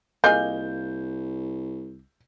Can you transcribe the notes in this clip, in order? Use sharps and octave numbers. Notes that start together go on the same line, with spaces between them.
C2 A#3 F4 G#4 D#5 G6